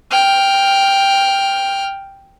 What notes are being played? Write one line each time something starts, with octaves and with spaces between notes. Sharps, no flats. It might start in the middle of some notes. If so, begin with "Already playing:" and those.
G5 F6